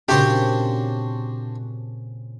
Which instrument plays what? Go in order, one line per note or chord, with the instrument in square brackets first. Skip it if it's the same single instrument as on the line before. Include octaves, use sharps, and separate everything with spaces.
[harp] A#2 C#3 C4 [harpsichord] D4 F#4 C5 [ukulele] G4